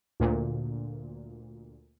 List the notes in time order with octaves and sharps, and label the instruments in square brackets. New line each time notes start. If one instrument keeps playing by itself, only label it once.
[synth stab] D2 A#2